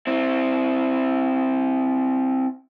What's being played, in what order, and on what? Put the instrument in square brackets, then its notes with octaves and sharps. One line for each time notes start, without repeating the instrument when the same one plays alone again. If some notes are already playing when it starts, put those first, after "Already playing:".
[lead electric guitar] C4 E4